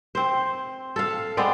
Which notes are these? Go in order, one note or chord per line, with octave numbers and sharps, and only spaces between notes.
C4 C5
A4 F5
G#3 B3 C4 D5